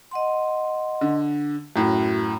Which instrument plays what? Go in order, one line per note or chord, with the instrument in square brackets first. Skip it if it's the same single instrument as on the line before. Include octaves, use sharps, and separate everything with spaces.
[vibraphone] D#5 F#5 C6
[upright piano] D3
[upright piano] F#2 A2 [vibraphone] F#4